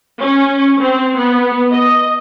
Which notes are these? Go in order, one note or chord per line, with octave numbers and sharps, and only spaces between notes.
C#4
C4
B3
D#5